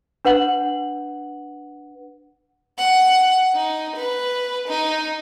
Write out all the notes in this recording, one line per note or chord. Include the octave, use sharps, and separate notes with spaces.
D4 B4 F#5 F#7
F#5
D#4
B4
D#4